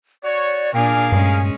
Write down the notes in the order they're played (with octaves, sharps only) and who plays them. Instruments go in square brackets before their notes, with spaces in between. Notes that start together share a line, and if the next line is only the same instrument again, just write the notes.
[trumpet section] F#4 C#5 [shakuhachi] D5
[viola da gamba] A#2 D4 [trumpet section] G#4 A#4 F5 [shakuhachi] G#5
[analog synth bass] G2 [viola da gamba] G#3 C#4